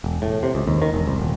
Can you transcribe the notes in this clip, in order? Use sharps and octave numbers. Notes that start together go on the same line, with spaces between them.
E1
A2
C3
C#2
D#2
D#3
E1
C2
D#1